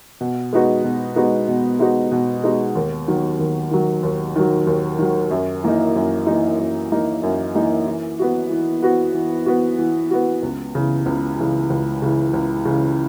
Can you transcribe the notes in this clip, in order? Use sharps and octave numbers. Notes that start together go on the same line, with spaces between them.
B2
G#3 B3 D#4 F#4
B2
G#3 B3 D#4 F#4
B2
G#3 B3 D#4 F#4
B2
G#3 B3 D#4 F#4
D#2
D#3 F#3
D#2
D#3 F#3
D#2
D#3 F#3
D#2
D#3 F#3
F#2
E3 A#3 D#4
F#2
E3 A#3 D#4
F#2
E3 A#3 D#4
F#2
E3 A#3 D#4
E3
B3 F#4
E3
B3 F#4
E3
B3 F#4
E3
B3 F#4
C#2
C#3 E3
C#2
C#3 E3
C#2
C#3 E3
C#2
C#3 E3